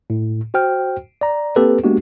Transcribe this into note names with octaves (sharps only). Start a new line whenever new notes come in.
A2
F#4 C5 G5 F6
D5 A#5
A#3 C4 G4 A4 B4
G#3 A#3 B3 D4 F#4 G4